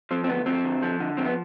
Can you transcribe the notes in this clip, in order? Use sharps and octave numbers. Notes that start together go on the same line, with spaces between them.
F3 C4
C4
D2 B3
F3 C4
D3
F3
D3
F3 C4
B3